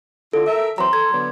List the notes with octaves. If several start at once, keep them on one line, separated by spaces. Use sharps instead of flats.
D3 E4 F4 A4
A#4 E5
E3 F#3 C4 A#5 C6
A4 G#6
D3 F#3 B3